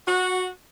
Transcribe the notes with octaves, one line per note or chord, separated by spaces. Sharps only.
F#4